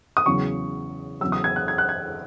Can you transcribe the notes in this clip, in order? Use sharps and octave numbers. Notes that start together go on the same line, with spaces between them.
D#6
E2 C#3 F#3 C#6
E2 C#3 F#3 E6
D#6
G#6
F#6
G#6
F#6
G#6